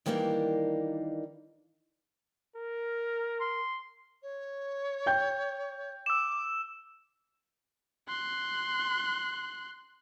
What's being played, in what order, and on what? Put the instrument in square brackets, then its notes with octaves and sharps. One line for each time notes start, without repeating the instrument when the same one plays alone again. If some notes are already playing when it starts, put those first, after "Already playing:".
[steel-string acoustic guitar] D#3 E3 G3 A#3 D4 D#4
[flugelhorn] A#4
[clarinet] C6
[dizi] C#5
[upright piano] G5 G6
[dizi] D6 [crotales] E6 E7
[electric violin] C6 F#6